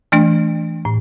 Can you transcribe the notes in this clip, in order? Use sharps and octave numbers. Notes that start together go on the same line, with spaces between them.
E3 A3 D4
A2